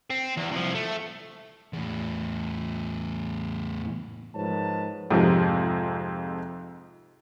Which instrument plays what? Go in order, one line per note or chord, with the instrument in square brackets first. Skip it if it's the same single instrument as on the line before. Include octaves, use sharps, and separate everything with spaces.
[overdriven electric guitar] C4
E2
C2 F3
A3
[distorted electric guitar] E2 A2
[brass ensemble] G#2 F3 A#4 B4 C#5 A5
[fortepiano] F2 G#2 C3 F3